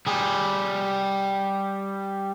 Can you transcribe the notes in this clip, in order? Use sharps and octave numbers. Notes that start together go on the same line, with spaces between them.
G3 G#4